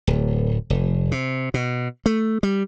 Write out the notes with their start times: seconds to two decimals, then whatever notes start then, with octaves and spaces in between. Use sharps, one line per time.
0.07 D1
0.70 F1
1.12 C3
1.54 B2
2.06 A3
2.43 G3